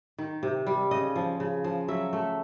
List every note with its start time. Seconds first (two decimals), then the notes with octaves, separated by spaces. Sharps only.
0.18 D#3
0.43 C3
0.67 G3
0.91 C#3 D#5
1.16 F3
1.40 C#3
1.64 F3
1.88 F#3 E5
2.13 A3